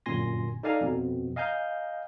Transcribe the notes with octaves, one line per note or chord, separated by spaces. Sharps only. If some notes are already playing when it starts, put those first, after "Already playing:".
G1 F#2 A#2 G#5 C6 A#6
D#4 A4 D5 F5 G#5 A#5
F2 B2
D#5 F5 G#5 A#5 G6